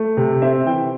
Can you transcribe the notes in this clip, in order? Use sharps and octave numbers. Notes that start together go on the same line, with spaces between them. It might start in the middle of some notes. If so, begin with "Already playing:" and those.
Already playing: A3
C3
C4 E5
E3 G5